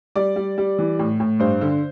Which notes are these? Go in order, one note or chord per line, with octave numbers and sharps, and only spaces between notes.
G3 D5
G3
G3
E3
A2
A2
G2 C5
D3